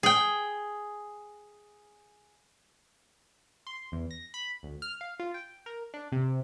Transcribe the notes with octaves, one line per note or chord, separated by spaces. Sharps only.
G#4 G5
C6
E2
A#6
B5
D2
F6
F5
F4
G5
A#4
D4
C3